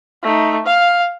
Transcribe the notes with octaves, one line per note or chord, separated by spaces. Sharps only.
A3 D#4
F5